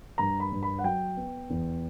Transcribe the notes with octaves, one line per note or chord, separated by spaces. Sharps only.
G2 A#5
B5
G2
B5
F#5
F#3 G5
B3
E2